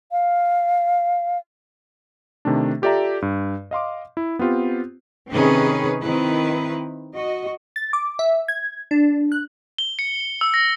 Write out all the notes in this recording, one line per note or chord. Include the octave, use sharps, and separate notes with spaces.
F5
C3 D#3 A3 D4
F4 G4 A4 D5 E5 A#5
G2
D#5 F5 C6 D6
E4
B3 C4 F4 G4
C3 D#3 C4 C#4 G#4 B4
D#3 C4 E4 B4
F#4 D#5
A6
D6
E5
G#6
D4
F#6
G7
C#7
E6
A#6